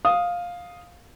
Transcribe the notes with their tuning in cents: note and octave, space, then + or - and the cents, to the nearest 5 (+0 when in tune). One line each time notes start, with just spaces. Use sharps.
F5 +10 D#6 +0